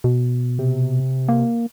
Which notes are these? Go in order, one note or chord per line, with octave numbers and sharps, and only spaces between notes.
B2
C3
A#3